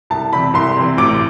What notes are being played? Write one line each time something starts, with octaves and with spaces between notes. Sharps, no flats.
C2 A5
C3 E3 B5
C2 C6
C3 E3
A1 D6